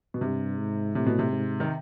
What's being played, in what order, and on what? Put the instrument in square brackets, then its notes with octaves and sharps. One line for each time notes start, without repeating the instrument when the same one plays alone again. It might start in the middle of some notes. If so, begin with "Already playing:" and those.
[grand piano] B2
[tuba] G2 [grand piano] C3
[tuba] G#2
[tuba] A2 [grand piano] C3
[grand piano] B2
C3
[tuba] G#2
[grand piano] D#3